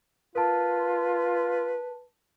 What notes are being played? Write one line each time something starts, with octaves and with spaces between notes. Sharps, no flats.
F4 A#4 B4 A5